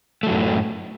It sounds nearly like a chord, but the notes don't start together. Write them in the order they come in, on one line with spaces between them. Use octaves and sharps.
A3 F#3 F#2 C3 A2